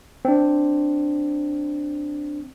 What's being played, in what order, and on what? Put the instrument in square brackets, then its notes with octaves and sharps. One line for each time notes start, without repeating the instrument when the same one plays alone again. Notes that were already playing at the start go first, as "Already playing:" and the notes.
[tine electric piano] C4 D4